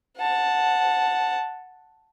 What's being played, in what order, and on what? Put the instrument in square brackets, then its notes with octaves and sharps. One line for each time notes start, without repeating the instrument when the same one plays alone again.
[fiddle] F#5 A5